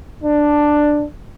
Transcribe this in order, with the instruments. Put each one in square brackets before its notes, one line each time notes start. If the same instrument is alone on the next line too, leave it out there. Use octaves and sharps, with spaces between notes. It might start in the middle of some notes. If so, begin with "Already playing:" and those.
[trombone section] D4